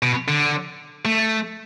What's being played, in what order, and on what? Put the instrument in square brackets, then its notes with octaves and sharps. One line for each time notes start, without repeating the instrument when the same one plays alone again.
[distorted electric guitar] B2
D3
A3